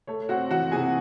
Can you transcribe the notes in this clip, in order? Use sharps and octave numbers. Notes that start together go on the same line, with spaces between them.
A3 C#5
C4 F#4 F#5
E3 F#4 F#5
C3 G#4 G#5